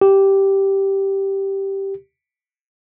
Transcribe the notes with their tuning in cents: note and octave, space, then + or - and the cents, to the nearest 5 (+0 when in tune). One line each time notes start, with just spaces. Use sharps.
G4 -5